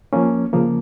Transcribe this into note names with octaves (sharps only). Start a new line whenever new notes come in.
F3 A#3 C#4
C#3 F3 A#3